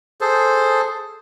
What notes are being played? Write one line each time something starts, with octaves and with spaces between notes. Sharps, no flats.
G#4 A4 C5